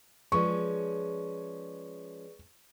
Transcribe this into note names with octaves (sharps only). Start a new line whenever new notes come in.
F3 G#3 C#4 G#4 B4 D5 C#6